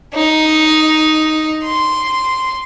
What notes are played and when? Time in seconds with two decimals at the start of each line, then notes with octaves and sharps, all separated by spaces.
0.15 D#4
1.64 C6